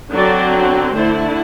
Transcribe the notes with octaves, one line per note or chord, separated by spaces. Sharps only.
D3 F#3 C4 D5
D3 A3 E4 C5